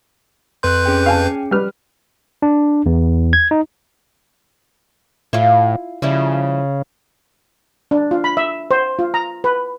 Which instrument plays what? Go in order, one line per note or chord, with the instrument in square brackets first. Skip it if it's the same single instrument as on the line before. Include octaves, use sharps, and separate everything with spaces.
[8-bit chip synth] F2 B4 G6 [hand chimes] C6 F#6
[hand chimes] C#4 G#4 G5
[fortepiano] F5 G#5 A5
G3 B4 F6
[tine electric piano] D4
E2
G#6
D#4
[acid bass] A2 [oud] E4 F4
[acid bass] C#3 [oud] F3 G3 E4
[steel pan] D4
F4
B5
E5
C5
F4
A#5
B4